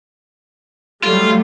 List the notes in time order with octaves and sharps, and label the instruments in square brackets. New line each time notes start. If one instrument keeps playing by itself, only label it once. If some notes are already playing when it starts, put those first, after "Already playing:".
[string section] F#3 G3 A3 [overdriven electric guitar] F4